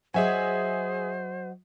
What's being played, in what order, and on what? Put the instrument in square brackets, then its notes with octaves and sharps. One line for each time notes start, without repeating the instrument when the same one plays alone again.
[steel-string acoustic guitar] F#3 D#5 [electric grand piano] G#4 E5 G#5 [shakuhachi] C5